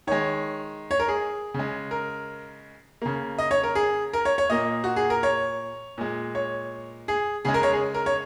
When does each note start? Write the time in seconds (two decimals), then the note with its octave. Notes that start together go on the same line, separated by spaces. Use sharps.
0.07 D#3 G#3 C#5
0.91 C#5
1.00 A#4
1.08 G#4
1.54 C#3 G#3
1.91 A#4
3.02 C#3 A#3
3.38 D#5
3.51 C#5
3.63 A#4
3.75 G#4
4.13 A#4
4.25 C#5
4.38 C#5
4.50 A#2 A#3 D#5
4.84 F#4
4.96 G#4
5.10 A#4
5.23 C#5
5.98 A#2 G#3
6.35 C#5
7.08 G#4
7.45 C#3 G#3 G#4
7.54 A#4
7.63 C#5
7.73 G#4
7.94 A#4
8.06 C#5